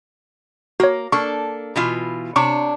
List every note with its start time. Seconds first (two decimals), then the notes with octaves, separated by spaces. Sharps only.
0.80 A#3 F#4 C#5
1.12 A#3 D4 A4 C#6
1.76 B2 E3 F4
2.36 C3 D4 C#5 C#6 D6